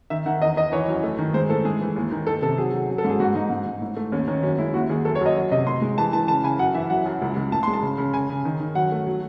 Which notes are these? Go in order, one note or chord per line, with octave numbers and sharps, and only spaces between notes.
D#3 E5
D#3 F#5
E2 D#5
E2 D#5
E3 C#5
F#2
A3
D#3
G#3 C5
A2 A4
G#3 G#4
E3
D#2
D#3
D#3 A4
C3 A4
F#3 G#4
F#3
F#3
A4
G#2
G#4
G#2 F#4
G#2 D#4
G#2
G#2
A2
A3
D#2 C#4
D#3 C#4
F#2 C#4
G#3 E4
D#2 F#4
D#2 G#4
F#2 A4
C#5
F#2 D#5
F#3
C3 D#5
A2 C6
G#3
E3 A5
E3 A5
C#3 A5
C#3 G#5
F#2 F#5
E3 E5
F#3 F#5
F#2
C#2
C#2
A2 A5
G#3 C6
A5
C#3
C#3
C#3 G#5
C#3
D#3
D#3
F#3 F#5
A3
F#3